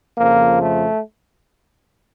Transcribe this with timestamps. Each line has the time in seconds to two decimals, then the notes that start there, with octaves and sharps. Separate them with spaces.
0.18 F2 C#3 F3 A#3
0.61 A3